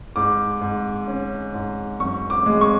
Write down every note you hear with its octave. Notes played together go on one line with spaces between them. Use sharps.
G#2 D6
G#2
C#4
G#2
F#2 C#6
D6
G#3
C#6